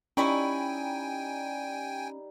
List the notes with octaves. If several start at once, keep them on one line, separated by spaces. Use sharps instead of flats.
G3 C#4 D#4 E4 G5 G#5 B5 C#6